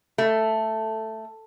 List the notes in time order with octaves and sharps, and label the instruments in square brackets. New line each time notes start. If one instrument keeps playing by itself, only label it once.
[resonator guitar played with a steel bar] A3